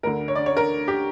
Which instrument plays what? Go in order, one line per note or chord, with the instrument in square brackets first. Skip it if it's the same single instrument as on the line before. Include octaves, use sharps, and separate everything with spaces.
[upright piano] D2 D3 A#4
C#5
D5
C#5
A#4
G4